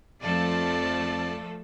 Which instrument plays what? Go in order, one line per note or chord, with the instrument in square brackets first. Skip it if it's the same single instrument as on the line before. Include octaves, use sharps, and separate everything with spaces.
[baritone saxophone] F2 [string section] F3 A3 A4 [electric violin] D5 A5